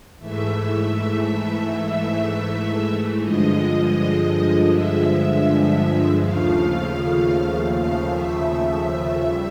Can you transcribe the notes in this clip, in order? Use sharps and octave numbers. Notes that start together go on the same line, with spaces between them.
G#2 E3 A3 E5
G2 D3 F3 G#3 D#5
E5
D#2 C#3 F3 A3 F5
F5
E5
G3